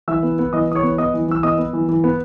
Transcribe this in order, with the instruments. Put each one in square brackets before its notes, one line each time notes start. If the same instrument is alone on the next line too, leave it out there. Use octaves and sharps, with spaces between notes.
[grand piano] E3 E5 E6
B3
B3
E3 D#5 D#6
E3 D#6
C#5 C#6
B3
B3 D#5 D#6
E3
E3 E6
B3 D#5 D#6
B3
E3
E3
B3